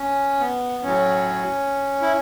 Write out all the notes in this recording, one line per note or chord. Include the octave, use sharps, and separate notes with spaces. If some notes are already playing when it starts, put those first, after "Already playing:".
Already playing: C#4
B3
A2 F#3 C#4
E4